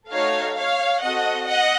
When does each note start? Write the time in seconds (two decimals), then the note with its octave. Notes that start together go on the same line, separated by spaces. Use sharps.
0.11 A3 D#4 F#4 A4 C#5 F5
0.56 C#5 F5
1.02 C4 F#4 A4 D#5 F#5
1.47 D#5 F#5